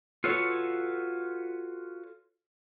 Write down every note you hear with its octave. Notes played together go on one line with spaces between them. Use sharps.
F4 F#4 A4 B4 C#5